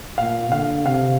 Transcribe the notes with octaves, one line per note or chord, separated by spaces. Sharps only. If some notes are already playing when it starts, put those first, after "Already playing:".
A#2 F5
D3 F5
C3 F5